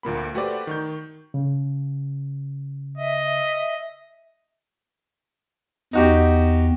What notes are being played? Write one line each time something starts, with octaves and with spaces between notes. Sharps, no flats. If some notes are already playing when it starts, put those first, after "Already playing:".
D2 A#2 A#3 B5
A3 F#4 G4 B4 C5 D5
D#3 C#6 G6
C#3
D#5 E5
E2 D#4 F#4 G4